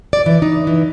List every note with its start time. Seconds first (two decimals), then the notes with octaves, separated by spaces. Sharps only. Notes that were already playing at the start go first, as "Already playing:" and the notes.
0.13 D5
0.26 E3
0.42 D#4
0.67 E3